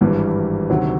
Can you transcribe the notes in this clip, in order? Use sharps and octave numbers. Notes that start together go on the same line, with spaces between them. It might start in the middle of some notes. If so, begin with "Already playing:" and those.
G#1 G2 E3 G3
D2 C3 D#3 F#3